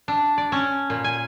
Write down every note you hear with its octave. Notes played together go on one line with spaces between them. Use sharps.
D4
D5
C#4
A#2
G#5